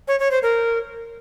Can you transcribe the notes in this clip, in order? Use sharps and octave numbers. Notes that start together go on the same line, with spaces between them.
C#5
C#5
C5
A#4